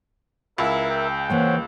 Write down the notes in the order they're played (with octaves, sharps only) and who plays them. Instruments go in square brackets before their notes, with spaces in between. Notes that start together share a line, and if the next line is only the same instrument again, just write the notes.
[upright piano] C#2 [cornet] E4 [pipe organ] A#4 E5
[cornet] G5
[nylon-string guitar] E3 A#3 F5 [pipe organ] C5 C#5 F#5